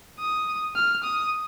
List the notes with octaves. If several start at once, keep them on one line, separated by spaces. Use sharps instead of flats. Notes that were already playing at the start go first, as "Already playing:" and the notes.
D#6
F6
D#6